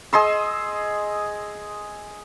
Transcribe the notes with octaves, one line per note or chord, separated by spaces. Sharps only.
G#4 D#5 C6 E6